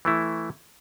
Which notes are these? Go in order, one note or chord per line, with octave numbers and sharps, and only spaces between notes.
E3 A3 E4